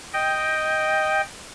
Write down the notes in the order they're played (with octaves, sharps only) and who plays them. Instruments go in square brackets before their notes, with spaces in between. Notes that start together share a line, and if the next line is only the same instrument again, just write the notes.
[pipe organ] D#5 G5